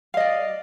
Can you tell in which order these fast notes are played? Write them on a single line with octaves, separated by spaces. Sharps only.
F5 D#5 D5